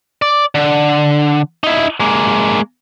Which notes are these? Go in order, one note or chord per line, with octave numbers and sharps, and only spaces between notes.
D5
D3
D#4 E4
G#3 A#3